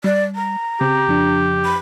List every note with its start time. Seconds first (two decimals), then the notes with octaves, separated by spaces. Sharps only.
0.04 G3 D5
0.35 A#5
0.81 C#3 C4 G4
1.07 F2 F3 D4
1.65 B5